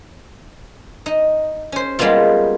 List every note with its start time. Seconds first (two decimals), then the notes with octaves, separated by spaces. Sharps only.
1.06 D#4
1.72 C#4 C5
1.99 G3 G#3 A#3 B3 F4